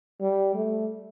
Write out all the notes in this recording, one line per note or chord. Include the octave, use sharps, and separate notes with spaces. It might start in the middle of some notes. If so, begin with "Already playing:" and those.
G3
A3